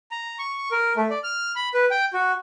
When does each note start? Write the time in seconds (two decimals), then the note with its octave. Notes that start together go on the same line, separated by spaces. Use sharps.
0.11 A#5
0.39 C#6
0.71 A#4
0.97 A3
1.11 D5
1.24 F6
1.56 B5
1.74 B4
1.91 G5
2.13 F#4